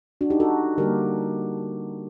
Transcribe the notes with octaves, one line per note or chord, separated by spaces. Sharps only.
D4 F#4
D#4 G4
F#4 A4
D3 G3 A#3 G4 A#4